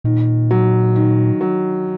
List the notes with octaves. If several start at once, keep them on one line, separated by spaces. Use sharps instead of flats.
A#2 D#3
F#3
D#3
F#3